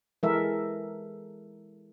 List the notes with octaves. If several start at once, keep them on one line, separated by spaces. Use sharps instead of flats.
E3 G#3 A4 A#4 E5